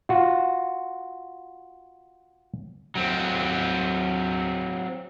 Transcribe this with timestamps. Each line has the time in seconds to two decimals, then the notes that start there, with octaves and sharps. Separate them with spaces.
0.09 F4 F#4
2.95 F#3 C4